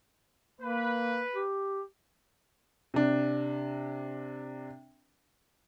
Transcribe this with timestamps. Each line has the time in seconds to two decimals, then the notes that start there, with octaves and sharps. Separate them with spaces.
0.61 A#3 B4
1.35 G4
2.94 C3 D4